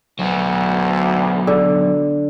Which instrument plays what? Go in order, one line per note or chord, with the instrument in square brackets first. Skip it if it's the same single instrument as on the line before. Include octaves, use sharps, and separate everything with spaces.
[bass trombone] D2 [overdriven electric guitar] F#3 B3
[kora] D3